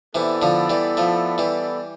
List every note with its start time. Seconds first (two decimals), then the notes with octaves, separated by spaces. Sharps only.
0.15 C3 E3 B3 E4 A4 D5
0.42 D3 F3
0.70 E3 G3
0.97 F3 A3
1.38 E3 G3